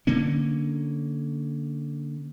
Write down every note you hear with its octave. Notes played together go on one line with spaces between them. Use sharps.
D3 A#3 C#4